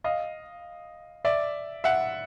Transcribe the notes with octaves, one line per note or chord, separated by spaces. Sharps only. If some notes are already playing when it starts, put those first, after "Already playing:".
D#5 F5
D5 E5
E5 F#5